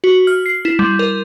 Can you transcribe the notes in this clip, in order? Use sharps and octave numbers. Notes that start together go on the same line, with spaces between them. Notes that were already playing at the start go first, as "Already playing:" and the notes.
F#4
F6
C7
E4
G3
A#4